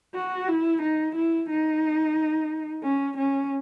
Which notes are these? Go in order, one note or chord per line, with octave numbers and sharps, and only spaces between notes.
F#4
E4
D#4
E4
D#4
C#4
C#4